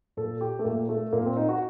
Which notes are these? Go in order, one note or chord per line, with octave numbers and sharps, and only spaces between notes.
A#2 A4
G4
A3
A#2 A#3
A3
A#2 A#3
C4
D#4
F#4